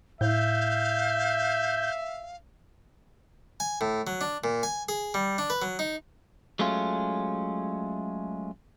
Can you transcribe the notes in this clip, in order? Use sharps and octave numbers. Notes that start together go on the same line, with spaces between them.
A2 E5 F5 G6
G#5
A2
F#3
D4
A#2
G#5
G#4
G3
D4
B4
F#3
D#4
F#3 G#3 A3 C#4 F4